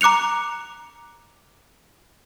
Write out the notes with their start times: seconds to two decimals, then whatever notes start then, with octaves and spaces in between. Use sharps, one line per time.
0.01 A#5 D6 F#6 C#7 F7